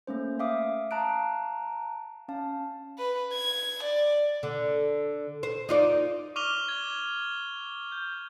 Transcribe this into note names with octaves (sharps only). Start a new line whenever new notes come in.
A3 A#3 C#4 C5
E5 F5 D6 D#6
F5 A5 A#5 F#6 D7
C#4 F5 A5
B4
G#6
D5
D3
C5
D#4 F4 D5
C#6 D6 F6 D#7 F7 G7
G#6
G6